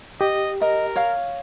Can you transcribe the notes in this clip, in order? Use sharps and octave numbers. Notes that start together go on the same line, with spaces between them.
G4 D#5
A#4 D#5
C#5 F5